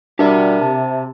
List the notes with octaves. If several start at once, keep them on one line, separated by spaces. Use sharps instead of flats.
G3 D4 F#4 G4 A#4 D5 E5
C3 A5